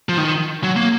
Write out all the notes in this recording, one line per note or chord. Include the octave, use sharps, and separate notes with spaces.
F3
D#3
F#3
A#3